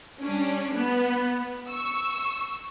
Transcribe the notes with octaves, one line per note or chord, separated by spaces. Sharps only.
G3 C#4 D4
B3
C#6 E6